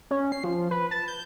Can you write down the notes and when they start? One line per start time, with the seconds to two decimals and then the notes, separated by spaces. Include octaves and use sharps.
0.11 C#4
0.32 C7
0.44 F3
0.71 B4
0.91 A5
1.08 G6